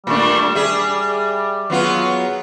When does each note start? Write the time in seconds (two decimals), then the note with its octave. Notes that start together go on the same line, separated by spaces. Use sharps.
0.07 A#2 G3 A3 D4
0.55 G#4 E5
1.70 F#3 B3 F4